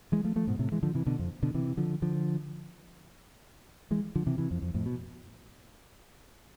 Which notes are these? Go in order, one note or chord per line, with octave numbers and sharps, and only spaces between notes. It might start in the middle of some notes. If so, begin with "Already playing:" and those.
E3 G#3
F3 A3
F3 A3
G#2 B2
A2 C3
E3 G#3
D3 F3
C3 E3
B2 D3
F2
B2 D3
C3 E3
D3 F3
D3 F3
E3 G#3
D3 F3
C3 E3
C3 E3
F2
F2
F2 A2
B2